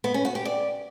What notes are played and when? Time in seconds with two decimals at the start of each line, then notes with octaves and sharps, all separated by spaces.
0.04 B3
0.14 C#4
0.25 F#4
0.35 G4
0.45 D5